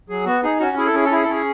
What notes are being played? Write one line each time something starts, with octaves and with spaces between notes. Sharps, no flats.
F#3 G#4
B3 F#4
D#4 G#4
C#4 F#4
E4 G#4
A4
C#4 G#4
A4
E4 G#4
A4
C#4 G#4